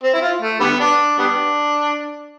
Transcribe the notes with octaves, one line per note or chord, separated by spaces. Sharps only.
C4
E4
F4
A3
D3 G3 B3
D4
G3 B3 D4